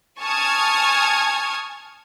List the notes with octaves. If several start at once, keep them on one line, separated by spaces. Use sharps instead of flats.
G#5 A5 C#6 D#6 F6 G#6